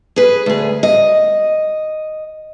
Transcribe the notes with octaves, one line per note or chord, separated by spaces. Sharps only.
G#4 B4
D2 G#4
D#5